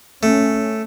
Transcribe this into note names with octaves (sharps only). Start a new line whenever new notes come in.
A3 C#4